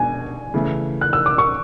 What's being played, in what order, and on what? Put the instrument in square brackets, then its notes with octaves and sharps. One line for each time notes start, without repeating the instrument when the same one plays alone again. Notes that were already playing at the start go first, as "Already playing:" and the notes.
Already playing: [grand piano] B2 G#3 D4 F#4 [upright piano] G#5
[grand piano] C#3 E3 A3
[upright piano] F#6
E6
D6
C#6